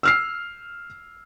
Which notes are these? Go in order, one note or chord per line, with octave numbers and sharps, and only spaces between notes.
E6 F6 C7